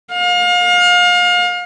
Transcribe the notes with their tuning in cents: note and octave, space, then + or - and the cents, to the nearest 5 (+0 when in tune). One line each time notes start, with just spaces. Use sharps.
F5 +35